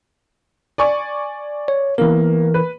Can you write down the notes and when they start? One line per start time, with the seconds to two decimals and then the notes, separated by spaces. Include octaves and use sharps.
0.78 D5 G#5 C#6
1.68 C#5
1.98 E3 A#3 B3 A#4
2.54 B4